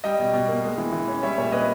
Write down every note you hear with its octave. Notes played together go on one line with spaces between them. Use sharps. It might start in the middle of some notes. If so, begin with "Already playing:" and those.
G3 D#5 G5
B2
B2
A#3
G#3
E3
E3
C#4
G3 C#5 E5
A#2 C#5 E5
A#2 B4 D#5